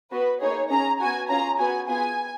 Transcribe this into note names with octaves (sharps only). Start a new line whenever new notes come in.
B3 F#4 B4
A#3 D#4 G#4 C#5
C#4 G#4 A#5
B3 F#4 G#5
C#4 F4 G#4 A#5
B3 F#4 G#5
B3 F4 G#4 G#5